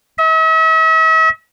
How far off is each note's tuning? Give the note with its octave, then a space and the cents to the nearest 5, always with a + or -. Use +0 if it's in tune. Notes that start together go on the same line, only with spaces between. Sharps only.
E5 -45